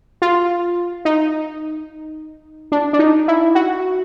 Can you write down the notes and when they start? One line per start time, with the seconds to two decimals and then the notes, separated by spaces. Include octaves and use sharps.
0.22 F4
1.05 D#4
2.72 D4
2.93 D4
2.99 D#4
3.28 E4
3.55 F#4